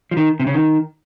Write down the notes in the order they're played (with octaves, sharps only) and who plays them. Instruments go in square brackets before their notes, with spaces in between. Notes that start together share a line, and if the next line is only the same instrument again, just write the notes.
[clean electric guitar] F3
D#3
C3
C#3
D#3